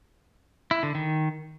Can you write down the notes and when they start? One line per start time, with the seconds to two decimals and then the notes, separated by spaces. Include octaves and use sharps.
0.71 E4
0.83 D3
0.95 D#3